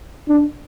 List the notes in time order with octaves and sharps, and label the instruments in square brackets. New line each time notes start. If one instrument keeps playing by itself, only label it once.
[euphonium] D4